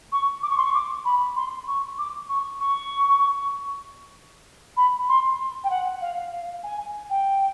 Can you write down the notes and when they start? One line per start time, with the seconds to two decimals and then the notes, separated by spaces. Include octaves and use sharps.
0.12 C#6
0.42 D6
0.50 C#6
0.57 C6
0.64 C#6
0.74 D6
1.05 B5
1.36 C6
1.67 C#6
1.98 D6
2.29 C#6
2.60 C#6
4.76 B5
5.08 C6
5.63 G5
5.70 F#5
6.01 F5
6.32 F5
6.63 G#5
7.09 G5